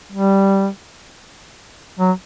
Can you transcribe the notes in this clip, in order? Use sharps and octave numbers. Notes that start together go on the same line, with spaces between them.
G3
F#3